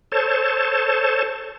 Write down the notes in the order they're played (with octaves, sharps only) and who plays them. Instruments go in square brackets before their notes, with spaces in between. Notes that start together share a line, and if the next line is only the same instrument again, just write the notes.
[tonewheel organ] A4 C5 C#5 A5